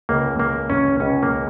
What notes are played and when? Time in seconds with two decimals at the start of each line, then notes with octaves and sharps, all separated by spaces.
0.09 C#2 C#3 A#3
0.39 A#3
0.70 C#4
1.00 C#2 C#3 C#4
1.23 A#3